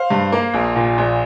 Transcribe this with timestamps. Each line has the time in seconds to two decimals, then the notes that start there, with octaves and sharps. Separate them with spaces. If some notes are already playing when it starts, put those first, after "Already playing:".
Already playing: C5 F5
0.10 G2
0.32 A#3
0.54 A#1
0.75 A#2
0.98 A#1